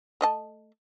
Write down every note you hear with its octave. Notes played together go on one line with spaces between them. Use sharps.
A3 D#5 A5